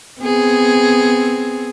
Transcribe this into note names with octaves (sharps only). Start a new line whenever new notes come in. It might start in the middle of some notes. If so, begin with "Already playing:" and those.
B3 C4 G#4